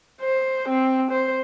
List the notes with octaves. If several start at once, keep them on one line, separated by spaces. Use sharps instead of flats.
C5
C4
C5